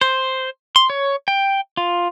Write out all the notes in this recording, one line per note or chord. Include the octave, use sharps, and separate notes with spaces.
C5
C6
C#5
G5
F4